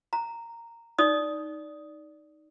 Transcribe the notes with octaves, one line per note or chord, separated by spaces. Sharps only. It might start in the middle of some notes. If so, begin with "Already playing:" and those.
A#5
D#4 D5 D#6